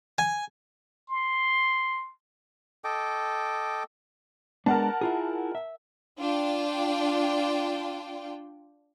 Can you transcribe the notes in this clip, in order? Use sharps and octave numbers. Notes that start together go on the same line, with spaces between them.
G#5
C6
A4 D#5 G5 D6
G#3 B3 D4 A#4 F#5 A5
E4 F4 G#4
E5
D4 F4 G5